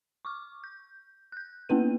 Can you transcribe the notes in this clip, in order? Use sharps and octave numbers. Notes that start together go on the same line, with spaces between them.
C#6 D6 F6
G6
F#6 G6
A#3 B3 C#4 E4 B4 D#7